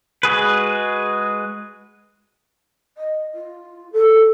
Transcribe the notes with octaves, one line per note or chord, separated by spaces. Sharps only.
G#3 F#4 G#4 B4
D#5
F4
A4